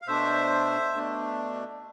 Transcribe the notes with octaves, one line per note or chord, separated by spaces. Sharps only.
F5
B2 A3 D4 C5 E5
B2 A3 D4